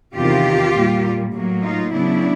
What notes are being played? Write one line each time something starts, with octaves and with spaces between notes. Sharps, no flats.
E2 C3 D#3 F4 G4
A#2 G3 A#3
A2 F#3 A#3
D#4 F4
C#3 F#3 B3 D4 E4